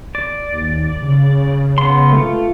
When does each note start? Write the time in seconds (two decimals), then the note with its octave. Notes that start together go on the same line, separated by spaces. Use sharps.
0.15 D5
0.53 D#2
1.02 C#3
1.78 B3 C6
2.12 A3 F4